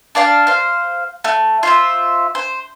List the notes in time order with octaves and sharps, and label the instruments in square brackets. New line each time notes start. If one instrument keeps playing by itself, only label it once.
[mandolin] D4 D5 F5 A5
C5 F5
A3
F4 C5 E5
C5